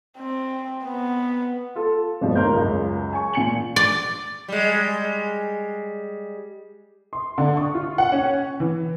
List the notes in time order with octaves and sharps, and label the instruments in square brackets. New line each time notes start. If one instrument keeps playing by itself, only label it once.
[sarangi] C4
B3
[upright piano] F4 A4
G2 B2 F3 G3
D#2 A#4 C6 G6
C#2 F#2 C#3
G#5 C#6
A#2 G#5 C#7 F#7
[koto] D5
[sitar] G3 G#3
[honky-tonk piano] C6
D3
C#6
F4
F#5
C#4
E3